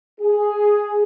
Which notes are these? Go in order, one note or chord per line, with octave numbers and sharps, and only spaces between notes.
G#4